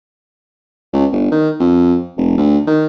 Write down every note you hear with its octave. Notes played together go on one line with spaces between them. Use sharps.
C#2
G1
D#3
F2
F1
D2
D#3